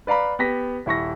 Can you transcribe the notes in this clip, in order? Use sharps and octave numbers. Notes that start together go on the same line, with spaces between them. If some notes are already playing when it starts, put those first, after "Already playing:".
B4 D5 F5 A#5 B5
B3 G4 A#6 B6
D#1 E4 C#6 A#6